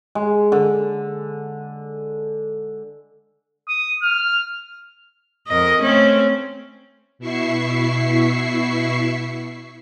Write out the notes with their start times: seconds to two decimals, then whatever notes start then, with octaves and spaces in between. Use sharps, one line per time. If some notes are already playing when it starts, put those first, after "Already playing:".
0.15 G#3
0.52 D3
3.68 D#6
4.03 F6
5.48 F2 A#4 D#5
5.82 A3 C4 C#4
7.19 B2 E4 E5 C#6 C7